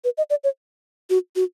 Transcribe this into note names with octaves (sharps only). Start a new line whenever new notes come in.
B4
D#5
D5
C#5
F#4
F#4